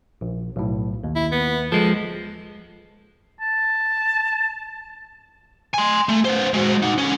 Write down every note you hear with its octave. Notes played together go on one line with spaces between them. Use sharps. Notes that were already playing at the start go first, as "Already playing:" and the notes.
A#1
B1 A2
D#2
E4
B3
F3 G#3 A4
A5
G#5 C6
A3
B3 C5
G#3 F#4
D#4 F#5
D3 C#4